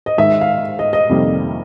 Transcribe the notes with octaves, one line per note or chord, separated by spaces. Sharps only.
D#5
G#2 D#3 G#3 E5
F5
D#5
D#5
F2 C3 D#3 G3 A#3